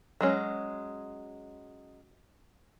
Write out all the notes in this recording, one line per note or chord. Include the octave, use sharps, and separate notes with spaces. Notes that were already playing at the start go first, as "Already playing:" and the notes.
F#3 G#3 C#4